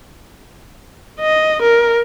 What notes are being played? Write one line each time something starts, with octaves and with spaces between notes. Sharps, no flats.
D#5
A#4